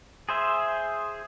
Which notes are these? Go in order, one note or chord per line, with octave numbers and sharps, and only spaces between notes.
G#4 C5 E5